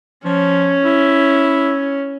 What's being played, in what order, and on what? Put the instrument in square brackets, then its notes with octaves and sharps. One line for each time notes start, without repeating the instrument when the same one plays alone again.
[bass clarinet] F3 [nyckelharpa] C#4
[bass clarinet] E4